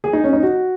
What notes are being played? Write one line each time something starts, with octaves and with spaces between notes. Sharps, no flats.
G#4
D#4
C#4
D#4
F#4